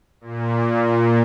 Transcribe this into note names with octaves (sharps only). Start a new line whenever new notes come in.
A#2